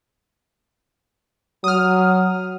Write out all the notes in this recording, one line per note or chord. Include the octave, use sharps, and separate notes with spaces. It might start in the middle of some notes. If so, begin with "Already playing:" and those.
F#3 D#6 F6